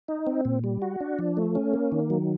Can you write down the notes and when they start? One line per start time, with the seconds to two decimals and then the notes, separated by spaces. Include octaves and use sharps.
0.08 D#4
0.27 C4
0.45 A#2
0.64 G3
0.82 F#4
1.00 D4
1.19 F3
1.37 A3
1.55 C#4
1.74 A#3
1.92 D#3
2.10 F#3